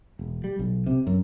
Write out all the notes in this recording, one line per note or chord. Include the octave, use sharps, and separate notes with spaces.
E1
G3
B1
C3
F#2